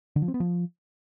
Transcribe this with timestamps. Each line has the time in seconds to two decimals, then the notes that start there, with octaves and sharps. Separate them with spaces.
0.16 D3
0.22 F3
0.28 C4
0.34 B3
0.40 F3